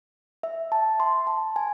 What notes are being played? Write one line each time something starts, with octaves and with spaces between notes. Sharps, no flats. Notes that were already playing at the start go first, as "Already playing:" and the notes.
E5
A5
C6
A5
G#5